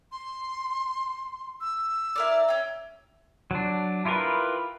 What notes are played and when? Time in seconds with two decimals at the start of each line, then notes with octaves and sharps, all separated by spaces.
0.12 C6
1.61 E6
2.16 E4 A#4 D5
2.49 C#4 G5
3.51 F#3 D4
4.05 E4 F4 G4 A#4 B4